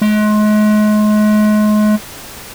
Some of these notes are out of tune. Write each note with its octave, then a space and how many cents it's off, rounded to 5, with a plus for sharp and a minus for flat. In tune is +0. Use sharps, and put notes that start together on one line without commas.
G#3 +35